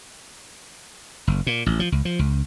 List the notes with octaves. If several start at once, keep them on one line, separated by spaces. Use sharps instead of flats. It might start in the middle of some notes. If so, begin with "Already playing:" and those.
F#1
A#2
A1
F3
C#2
F3
C#2